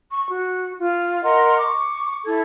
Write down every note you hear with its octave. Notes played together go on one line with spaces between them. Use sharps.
C#6
F#4
F4
A#4 D#5 F#5 C6
C#6 D6
E4 A4 G#6